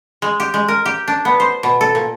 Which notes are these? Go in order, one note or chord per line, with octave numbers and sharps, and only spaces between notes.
G#3
G4
G#3
A#4
G4
D4
B3
C5
B2
A4
A#2